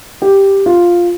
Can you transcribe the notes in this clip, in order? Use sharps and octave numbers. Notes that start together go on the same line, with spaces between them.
G4
F4